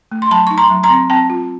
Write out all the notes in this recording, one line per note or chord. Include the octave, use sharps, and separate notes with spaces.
A3
C6
F#3 A5 B5
D#4 C#6
A#5 C6
F#3
A#5 C6
C4
C4 G5 A5
F4